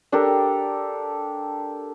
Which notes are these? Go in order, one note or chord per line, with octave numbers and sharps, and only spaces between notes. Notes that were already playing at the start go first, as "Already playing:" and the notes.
D4 G4 A4 A#4